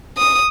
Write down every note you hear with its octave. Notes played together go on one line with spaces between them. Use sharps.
D#6